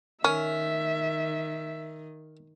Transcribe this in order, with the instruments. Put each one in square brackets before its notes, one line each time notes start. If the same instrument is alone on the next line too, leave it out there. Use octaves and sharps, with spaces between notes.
[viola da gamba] D#3 [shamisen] C#4 [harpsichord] A#4 [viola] E5